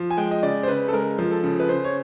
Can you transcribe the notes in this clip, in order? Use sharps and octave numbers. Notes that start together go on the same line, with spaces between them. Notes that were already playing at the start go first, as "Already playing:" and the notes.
Already playing: F3
G#5
G#3 G5
D#5
C#3 D5
C5
C#3 B4
A4
G#3 A#4
F3
A4
C#3
B4
C#3 C5
C#5